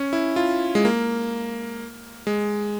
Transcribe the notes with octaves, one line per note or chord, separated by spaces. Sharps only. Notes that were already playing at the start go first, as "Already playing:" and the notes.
Already playing: C#4
E4
F4
G#3
A#3
G#3